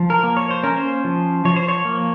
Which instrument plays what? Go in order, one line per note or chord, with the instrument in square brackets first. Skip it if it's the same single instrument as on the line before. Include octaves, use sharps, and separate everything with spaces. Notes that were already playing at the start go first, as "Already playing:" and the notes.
Already playing: [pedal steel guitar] F3
A#4
A#3
C#5
C5
C#4 A#4
C5
F3
F3 C#5
C5
C#5
A#3